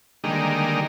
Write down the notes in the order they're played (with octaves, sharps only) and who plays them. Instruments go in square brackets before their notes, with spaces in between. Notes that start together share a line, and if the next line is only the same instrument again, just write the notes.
[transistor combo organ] D3 D#3 G3 G#3 A#3 D#4